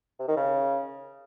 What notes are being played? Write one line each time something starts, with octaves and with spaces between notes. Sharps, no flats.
C3
D#3
C#3